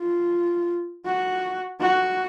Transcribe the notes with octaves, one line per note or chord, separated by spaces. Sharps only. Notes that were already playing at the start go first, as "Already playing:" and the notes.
Already playing: F4
F#4
F#4